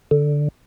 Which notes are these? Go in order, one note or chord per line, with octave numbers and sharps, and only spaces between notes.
D3